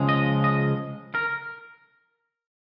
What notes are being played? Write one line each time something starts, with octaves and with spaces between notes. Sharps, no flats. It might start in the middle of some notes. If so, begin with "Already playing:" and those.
Already playing: C#2 C#3 F3 G#3
D#5
D#5
A#4